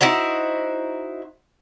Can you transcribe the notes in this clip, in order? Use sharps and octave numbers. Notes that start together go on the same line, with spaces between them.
D#4 E4 F#4 C5